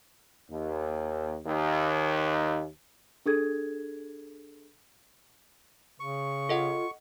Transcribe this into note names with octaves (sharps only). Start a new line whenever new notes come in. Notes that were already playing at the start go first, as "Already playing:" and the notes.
D#2
D#2
D4 G#4 A4 G#6
C#3 C#6
F4 A4 D#5 F#5